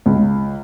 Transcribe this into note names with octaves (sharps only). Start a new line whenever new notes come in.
C#2